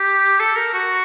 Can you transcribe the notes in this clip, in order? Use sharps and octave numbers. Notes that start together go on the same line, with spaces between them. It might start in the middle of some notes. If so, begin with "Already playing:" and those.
Already playing: G4
A4
A#4
F#4